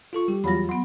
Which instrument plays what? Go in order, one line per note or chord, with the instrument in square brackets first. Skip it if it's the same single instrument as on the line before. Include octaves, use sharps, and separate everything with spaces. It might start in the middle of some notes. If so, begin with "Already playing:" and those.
[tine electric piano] F4 A4 C#6
G3 G4
[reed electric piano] E2 F#3 F4 [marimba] B5 A#6
[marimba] F#3 B3 [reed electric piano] C6